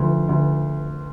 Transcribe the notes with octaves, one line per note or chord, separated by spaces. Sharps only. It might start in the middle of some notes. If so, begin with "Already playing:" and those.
Already playing: D2 F3
D2